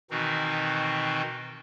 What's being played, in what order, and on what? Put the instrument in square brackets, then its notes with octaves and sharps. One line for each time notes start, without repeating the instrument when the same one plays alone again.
[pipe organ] B2 D#3 E3 C4 D#4 F#4